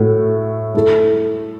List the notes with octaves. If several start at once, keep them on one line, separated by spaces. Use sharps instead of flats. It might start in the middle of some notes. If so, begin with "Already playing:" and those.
Already playing: A2 A3 F#4 A4
A3 E4 A4